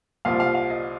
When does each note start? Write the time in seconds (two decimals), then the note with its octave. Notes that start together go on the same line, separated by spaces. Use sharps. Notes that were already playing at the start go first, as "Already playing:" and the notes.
0.25 C2 A#2 F3 F5
0.40 F5
0.55 F5
0.70 D#5